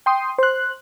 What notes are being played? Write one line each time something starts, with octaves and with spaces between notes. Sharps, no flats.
G5 C6 D#6
C5 F#6